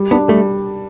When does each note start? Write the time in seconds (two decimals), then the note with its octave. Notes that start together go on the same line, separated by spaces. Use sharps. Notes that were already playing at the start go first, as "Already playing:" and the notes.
Already playing: G3
0.11 B3 D4
0.29 G3 A3